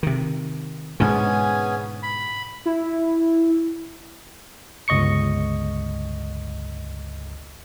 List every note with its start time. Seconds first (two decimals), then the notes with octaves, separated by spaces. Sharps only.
0.03 C3 D#3
1.00 G#2 B2 D3 B3 C#4 G#4
2.03 B5
2.66 E4
4.88 G1 C#2 D#5 C#6 C#7